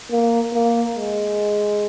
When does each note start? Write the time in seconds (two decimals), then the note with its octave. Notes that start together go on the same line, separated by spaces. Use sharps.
0.11 A#3
0.53 A#3
0.96 G#3